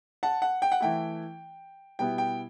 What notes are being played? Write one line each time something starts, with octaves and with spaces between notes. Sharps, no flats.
F#5 A5
F#5
G5
F#5
E3 A3 E4 G5
B2 G3 B3 E4 G5
G5